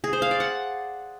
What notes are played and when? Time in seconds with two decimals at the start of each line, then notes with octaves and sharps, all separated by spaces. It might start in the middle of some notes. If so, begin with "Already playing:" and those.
0.04 G#4
0.13 C5
0.22 F5
0.31 D5
0.40 F#5